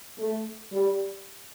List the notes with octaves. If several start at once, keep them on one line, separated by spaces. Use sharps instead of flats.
A3
G3